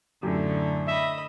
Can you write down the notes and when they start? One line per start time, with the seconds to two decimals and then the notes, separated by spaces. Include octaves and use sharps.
0.23 F#2 A2 D3 A3 G4
0.87 D#5 E5 B5